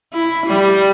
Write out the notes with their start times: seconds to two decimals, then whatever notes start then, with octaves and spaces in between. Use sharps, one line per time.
0.13 E4
0.46 G3